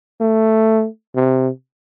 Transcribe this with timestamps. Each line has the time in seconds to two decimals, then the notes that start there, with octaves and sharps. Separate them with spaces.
0.21 A3
1.16 C3